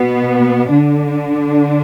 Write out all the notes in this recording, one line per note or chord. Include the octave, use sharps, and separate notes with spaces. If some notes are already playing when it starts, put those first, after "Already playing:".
Already playing: B2 B3
D3 D4